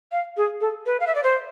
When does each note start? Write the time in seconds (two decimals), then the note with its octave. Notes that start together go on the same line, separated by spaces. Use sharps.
0.12 F5
0.37 G#4
0.61 A4
0.86 B4
1.00 F5
1.07 E5
1.15 D5
1.23 C5